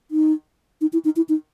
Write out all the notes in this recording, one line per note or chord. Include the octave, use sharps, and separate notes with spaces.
D#4
D#4
E4
D#4
E4
D#4